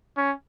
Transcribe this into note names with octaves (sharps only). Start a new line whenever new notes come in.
C#4